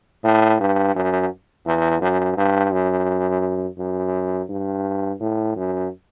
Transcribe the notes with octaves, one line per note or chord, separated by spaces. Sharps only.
A2
G2
F#2
E2
F#2
G2
F#2
F#2
G2
A2
F#2